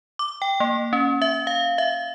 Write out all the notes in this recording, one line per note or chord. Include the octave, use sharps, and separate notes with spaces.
D6
G5
A#3
C#4
E5
F5
E5